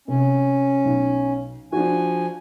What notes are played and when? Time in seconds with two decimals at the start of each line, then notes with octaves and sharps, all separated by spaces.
0.08 C3 C#4
0.85 B1
1.72 F3 D4 F#4 G#5